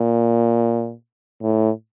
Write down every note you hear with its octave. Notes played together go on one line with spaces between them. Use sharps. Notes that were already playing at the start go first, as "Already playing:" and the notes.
Already playing: A#2
A2